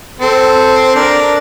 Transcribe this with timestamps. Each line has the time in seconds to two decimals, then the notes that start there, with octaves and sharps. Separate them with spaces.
0.20 C4 A4
0.95 D4 A#4